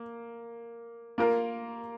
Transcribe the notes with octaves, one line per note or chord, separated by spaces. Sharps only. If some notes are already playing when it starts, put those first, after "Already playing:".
Already playing: A#3
A#3 F4 A#4